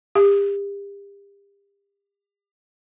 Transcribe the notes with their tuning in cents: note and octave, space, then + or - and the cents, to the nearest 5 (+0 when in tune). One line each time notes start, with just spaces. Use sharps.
G4 +35